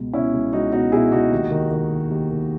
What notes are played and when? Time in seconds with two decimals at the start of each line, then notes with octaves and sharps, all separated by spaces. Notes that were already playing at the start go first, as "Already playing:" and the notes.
Already playing: C#2 B2
0.13 B2 C#4 E4
0.33 C#2
0.53 C#2 D#4 F#4
0.72 B2 D#4 F#4
0.92 B2 E4 G#4
1.12 C#2 D#4 F#4
1.32 D#2
1.51 D#3
1.71 D#3
1.91 D#2
2.10 D#2
2.31 D#3